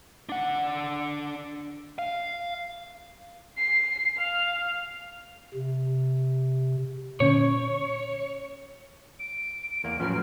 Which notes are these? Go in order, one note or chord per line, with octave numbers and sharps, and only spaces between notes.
D4 F#5
F5
C7
F5
C3
A#2 D3 C#4 C#5
D7
E2 A#3
A2 F3 F#3 B3 C#4 F6